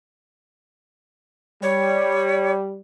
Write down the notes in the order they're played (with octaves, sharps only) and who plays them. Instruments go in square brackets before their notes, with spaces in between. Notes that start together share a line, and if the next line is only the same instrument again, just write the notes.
[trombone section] G3 [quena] C#5